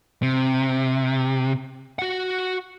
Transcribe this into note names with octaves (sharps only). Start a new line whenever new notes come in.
C3
F#4 F#5